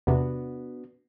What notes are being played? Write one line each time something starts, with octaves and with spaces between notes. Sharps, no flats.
E2 C3 B3 D4 F#4